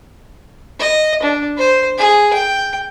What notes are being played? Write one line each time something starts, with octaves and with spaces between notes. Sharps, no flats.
D#5
D4
C5
G#4
G5